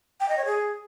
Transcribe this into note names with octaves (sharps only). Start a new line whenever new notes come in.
G5
D#5
C#5
G#4